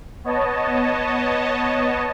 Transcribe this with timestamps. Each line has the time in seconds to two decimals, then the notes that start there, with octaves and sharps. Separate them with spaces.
0.24 B3 C#5 D#5 A5